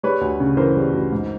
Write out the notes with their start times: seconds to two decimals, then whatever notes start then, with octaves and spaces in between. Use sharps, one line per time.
0.03 G3 B4 C#5
0.21 D2
0.40 C#3
0.57 E3 A#4 C5
0.76 G3
0.93 D2
1.12 G#2